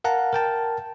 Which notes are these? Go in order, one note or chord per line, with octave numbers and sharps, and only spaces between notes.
A#4 F5 F#5 A5 A#5
A#4 G5 A5